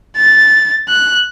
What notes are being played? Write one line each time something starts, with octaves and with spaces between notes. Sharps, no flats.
A6
F#6